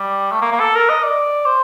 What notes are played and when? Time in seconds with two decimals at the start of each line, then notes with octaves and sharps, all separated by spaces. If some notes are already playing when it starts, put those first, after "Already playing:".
Already playing: G3
0.32 A3
0.41 A#3
0.51 A#3
0.60 A4
0.75 A#4
0.89 D#5
1.03 D5
1.46 C5